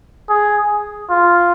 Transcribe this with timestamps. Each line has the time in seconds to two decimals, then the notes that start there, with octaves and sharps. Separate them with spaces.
0.29 G#4
1.10 F4